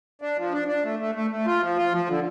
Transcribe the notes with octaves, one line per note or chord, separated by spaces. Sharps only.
D4
F3
D4
D4
A3
A3
A3
A3
F4
F3
F4
F3
D3